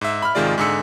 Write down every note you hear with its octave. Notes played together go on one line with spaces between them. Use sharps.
G#2 E5
B5 F6
G#1 C3 D#3 G#3 F4 D5
G#2 D3 G#4 E6 C#7